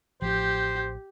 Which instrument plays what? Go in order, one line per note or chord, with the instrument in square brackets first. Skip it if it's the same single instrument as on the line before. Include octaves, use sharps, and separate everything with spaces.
[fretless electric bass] A1 F3 [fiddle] G4 [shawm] C5